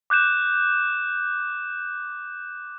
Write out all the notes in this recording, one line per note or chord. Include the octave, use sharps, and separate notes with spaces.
D6 F#6 G6 E7